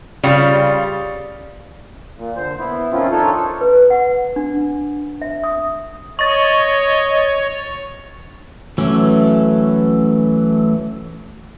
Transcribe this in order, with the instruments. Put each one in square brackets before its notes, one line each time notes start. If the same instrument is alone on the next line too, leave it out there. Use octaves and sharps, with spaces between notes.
[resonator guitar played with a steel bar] C#3 G3 F4
[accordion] A#2
D3 C5
B3 E4
D#3 F3 C4 C#4 E4 F4
D4 D#4 F4 A4 C#5
[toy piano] B4
F#5
D4
E5
D#6
[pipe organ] C#5 [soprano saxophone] D#5 [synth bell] C#6 A6
[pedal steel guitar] E3 F#3 A3 C#4